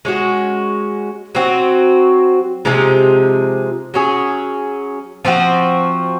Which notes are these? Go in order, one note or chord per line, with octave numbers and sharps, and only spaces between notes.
G#3 C#4 F#4
F#3 C4 F#4
C3 F3 G#3 D#4
F#3 C#4 G#4
F3 C4 F#4